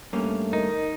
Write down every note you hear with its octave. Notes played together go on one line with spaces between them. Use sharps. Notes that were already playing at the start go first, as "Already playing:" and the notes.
G2 A3 A#3 C#4
D#3 D#4